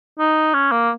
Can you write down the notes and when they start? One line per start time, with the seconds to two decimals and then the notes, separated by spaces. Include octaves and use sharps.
0.19 D#4
0.54 C#4
0.72 A#3